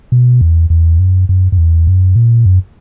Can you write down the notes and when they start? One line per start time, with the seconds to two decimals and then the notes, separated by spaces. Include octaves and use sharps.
0.12 B2
0.41 E2
0.70 E2
0.99 F#2
1.29 F#2
1.52 F#2
1.58 E2
1.87 F#2
2.16 A#2
2.46 F#2